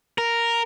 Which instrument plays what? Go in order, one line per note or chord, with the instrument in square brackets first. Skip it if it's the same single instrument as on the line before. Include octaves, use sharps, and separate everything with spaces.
[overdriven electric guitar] A#4